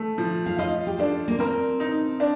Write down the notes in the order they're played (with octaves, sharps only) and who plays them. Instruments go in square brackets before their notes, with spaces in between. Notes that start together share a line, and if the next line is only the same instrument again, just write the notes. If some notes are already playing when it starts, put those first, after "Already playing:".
Already playing: [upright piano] A3
F3
[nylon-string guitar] F5
[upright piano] F4 [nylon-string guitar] D#5
[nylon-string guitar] G4
[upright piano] D4 [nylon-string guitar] A4
[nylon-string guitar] A#3
[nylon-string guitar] C4 [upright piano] A#4
[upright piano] D#4
D4